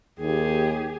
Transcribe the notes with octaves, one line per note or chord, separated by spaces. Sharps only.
D#2 G4 G#4